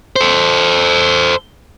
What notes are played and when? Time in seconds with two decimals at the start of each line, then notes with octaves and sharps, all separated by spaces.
0.16 A4 C5